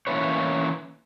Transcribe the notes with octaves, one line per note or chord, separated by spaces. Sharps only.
E3 A#3 C#4 E4 B4 C#5